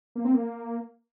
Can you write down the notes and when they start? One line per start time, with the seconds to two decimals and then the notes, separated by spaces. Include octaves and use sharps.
0.16 A#3
0.25 C4
0.34 A#3